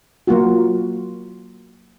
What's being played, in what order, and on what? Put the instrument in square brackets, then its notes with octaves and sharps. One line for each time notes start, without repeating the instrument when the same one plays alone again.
[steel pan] F#3 A#3 F4 F#4